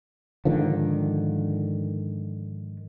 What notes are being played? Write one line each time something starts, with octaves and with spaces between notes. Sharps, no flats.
G#2 D3 D#3 F3